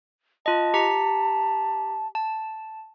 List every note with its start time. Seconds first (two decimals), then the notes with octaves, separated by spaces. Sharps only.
0.46 F4 D#5 A5
0.74 G4 A#5 B6
2.15 A5